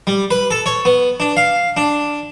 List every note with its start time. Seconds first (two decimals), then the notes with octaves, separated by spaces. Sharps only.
0.07 G3
0.31 B4
0.51 A4
0.66 C#5
0.85 B3
1.20 D4
1.37 F5
1.77 D4